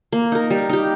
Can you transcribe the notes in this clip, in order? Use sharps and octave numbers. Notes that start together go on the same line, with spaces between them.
A#3
D#4 A#4
G3
D#4 G4